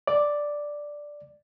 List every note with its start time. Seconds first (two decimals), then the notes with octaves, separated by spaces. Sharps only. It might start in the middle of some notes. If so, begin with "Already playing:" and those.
0.07 D5